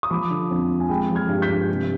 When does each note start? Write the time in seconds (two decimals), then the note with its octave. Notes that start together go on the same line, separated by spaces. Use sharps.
0.03 D#6
0.10 F3 B5 D6
0.30 D3
0.51 F2
0.69 F2
0.80 G#5
0.89 G#3 G5 B5
1.09 F3
1.15 F6 G#6
1.28 G2
1.42 G6 B6
1.49 G2
1.68 C3